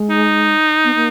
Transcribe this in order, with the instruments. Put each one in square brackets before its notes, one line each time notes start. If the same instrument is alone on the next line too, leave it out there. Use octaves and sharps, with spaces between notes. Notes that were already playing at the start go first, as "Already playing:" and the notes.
Already playing: [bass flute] G#3
[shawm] D#4
[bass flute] B3
A#3